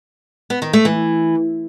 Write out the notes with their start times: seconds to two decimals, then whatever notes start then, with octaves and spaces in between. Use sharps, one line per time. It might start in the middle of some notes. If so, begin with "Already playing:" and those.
0.50 B3
0.62 D#3
0.73 A3
0.85 E3